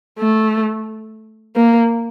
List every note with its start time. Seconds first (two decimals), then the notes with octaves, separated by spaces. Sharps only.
0.19 A3
1.56 A#3